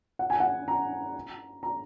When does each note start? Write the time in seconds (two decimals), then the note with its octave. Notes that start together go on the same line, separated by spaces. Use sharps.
0.19 F#5
0.30 G#5
0.40 F#5
0.68 A#5
1.63 A#5